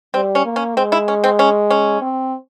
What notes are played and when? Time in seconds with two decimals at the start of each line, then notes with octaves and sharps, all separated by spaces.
0.14 G3 C4
0.35 C#4
0.45 A#3
0.56 C#4
0.77 G#3 C4
0.92 E4
1.08 C#4
1.24 C4
1.39 C#4
1.70 C#4
2.01 C4